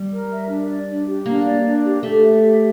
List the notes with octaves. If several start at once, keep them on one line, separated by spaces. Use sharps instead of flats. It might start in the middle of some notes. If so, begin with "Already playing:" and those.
Already playing: G3
A#4
E5
D4
D5
D4
G4
A#3 D4
D5
D4
G4
A3 G4
E5
G4